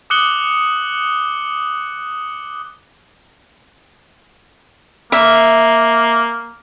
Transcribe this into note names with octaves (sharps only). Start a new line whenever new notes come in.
D6 D#6 F#6 C#7 F#7 G7
A#3 E5